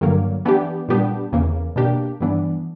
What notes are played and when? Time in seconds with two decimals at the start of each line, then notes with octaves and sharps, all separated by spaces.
0.01 G2 D3 F#3 A#3
0.45 E3 B3 D4 G4
0.88 A#2 G3 B3 D4 G4
1.32 E2 C#3 E3 A#3
1.76 B2 A#3 D4 G4
2.20 G2 E3 B3 D4